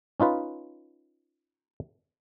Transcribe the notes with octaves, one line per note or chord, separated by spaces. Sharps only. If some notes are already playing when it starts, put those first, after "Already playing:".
C#4 D#4 F4 B4